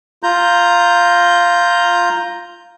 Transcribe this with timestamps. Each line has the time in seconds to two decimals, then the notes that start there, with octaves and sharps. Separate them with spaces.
0.23 F4 A#5 G6